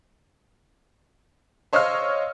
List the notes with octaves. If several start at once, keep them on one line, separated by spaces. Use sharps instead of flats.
C5 C#5 D#5 F5 E6 F6